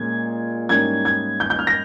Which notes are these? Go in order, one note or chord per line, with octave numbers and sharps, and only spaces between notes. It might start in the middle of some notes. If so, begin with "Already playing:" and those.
Already playing: A#2 G#3 C#4 G#6
G#2 G3 A#3 C#4 E4 G#6
G#6
G6
G6
F6
A#6